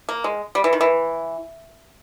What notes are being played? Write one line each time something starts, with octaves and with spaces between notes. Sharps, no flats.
A#3
G#3
G3
E3
D#3
E3